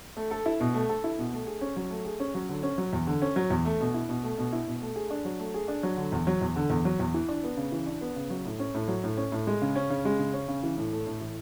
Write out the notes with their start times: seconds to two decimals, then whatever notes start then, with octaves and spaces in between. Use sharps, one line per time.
0.17 A3
0.31 A4
0.46 E4
0.60 B2
0.74 A3
0.89 A4
1.04 E4
1.18 B2
1.33 A3
1.47 G#4
1.61 C#4
1.76 F#3
1.91 A3
2.05 G#4
2.20 C#4
2.35 F#3
2.49 D3
2.63 C#4
2.78 F#3
2.93 E2
3.07 D3
3.22 C#4
3.36 F#3
3.50 E2
3.65 A3
3.80 B2
3.94 E4
4.09 B2
4.23 A3
4.38 B2
4.52 E4
4.67 B2
4.82 A3
4.96 G#4
5.10 D4
5.25 F#3
5.40 A3
5.54 G#4
5.68 D4
5.83 F#3
5.97 D3
6.12 E2
6.27 F#3
6.41 E2
6.56 D3
6.70 E2
6.85 F#3
6.99 E2
7.14 E3
7.28 D4
7.44 B3
7.57 C#3
7.72 E3
7.86 D4
8.01 B3
8.16 C#3
8.30 F#3
8.45 A2
8.59 C#4
8.74 A2
8.88 F#3
9.04 A2
9.17 C#4
9.32 A2
9.47 G#3
9.62 C#3
9.76 C#4
9.90 C#3
10.05 G#3
10.19 C#3
10.33 C#4
10.48 C#3
10.63 E3
10.77 A2
10.92 A3
11.07 A2
11.21 E3